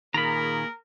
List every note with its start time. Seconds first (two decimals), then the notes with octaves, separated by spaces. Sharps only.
0.14 A#2 D#3 A#3 G#4 A#4 A#5 B5